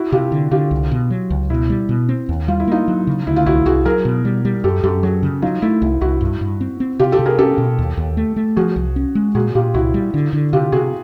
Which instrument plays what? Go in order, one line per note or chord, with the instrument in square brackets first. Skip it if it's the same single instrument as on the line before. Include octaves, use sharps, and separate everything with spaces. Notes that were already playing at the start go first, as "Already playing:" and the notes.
Already playing: [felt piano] E4 F#4
[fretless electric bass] C3 [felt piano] F4 G4
[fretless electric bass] D3
[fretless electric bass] D3 [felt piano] F4 G4
[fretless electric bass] C2
B2
F#3
C#2
[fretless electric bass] B2 [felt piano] E4
[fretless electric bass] G3
B2
C4
D#2
[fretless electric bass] G3 [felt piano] F4
[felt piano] E4
[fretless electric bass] A#3 [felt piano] D#4 F4
[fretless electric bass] F#3
C#3
[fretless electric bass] D2 [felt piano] E4
[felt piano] F4
[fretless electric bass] C2 [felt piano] E4 F#4
[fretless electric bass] C2 [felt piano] F#4 G#4
[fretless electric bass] F#3 [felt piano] G#4 A#4
[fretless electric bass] B2
G3
G3
[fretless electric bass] F#2 [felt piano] G4 A4
[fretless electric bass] F#2 [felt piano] G4 A4
[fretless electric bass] F#3 [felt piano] F#4 G#4
[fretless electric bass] C#3
[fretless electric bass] F#3 [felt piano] D#4 F4
[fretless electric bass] A3 [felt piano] E4
[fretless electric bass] C2 [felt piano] E4
[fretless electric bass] C2 [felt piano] E4 F#4
[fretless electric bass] G2
G2
C4
C4
[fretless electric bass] C3 [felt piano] F4 G4
[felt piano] G4 A4
[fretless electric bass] C3
[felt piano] G#4 A#4
[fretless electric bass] C#4 [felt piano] G4 A4
[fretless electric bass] B2
D#2
D#2
A3
A3
[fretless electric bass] F3 [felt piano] F#4 G#4
[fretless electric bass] C2
C#4
G#3
[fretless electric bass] A#2 [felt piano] F#4 G#4
[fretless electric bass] A#2 [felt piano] F4 G4
[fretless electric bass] C2 [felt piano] E4 F#4
[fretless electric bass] G3
D3
D3
[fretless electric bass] C3 [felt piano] F4 G4
[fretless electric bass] C3 [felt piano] F#4 G#4